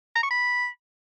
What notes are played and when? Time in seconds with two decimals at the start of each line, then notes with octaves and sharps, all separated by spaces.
0.15 A#5
0.23 C#6
0.31 B5